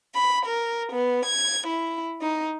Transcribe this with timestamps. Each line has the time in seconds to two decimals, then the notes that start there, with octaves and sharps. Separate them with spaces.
0.15 B5
0.46 A#4
0.91 B3
1.26 G#6
1.65 E4
2.22 D#4